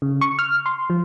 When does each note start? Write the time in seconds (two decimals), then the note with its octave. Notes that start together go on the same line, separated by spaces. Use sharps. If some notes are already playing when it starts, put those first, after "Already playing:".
0.02 C#3
0.21 C#6
0.39 F6
0.66 C6
0.90 F3